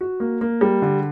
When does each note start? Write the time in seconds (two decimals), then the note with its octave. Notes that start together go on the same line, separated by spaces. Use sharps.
0.01 F#4
0.20 A#3
0.41 A#3
0.61 G3
0.82 D3